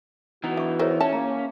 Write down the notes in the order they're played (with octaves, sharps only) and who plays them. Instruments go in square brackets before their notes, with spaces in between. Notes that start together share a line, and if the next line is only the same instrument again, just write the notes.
[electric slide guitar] E3 B3 D#4 [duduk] F#4
[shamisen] D4 [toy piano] E5 C#6
[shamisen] E4 A#4 C5 [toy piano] G#4 C#5
[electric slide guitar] C#4 [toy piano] C#5 E5 [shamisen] A5
[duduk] A#3 [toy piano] A#5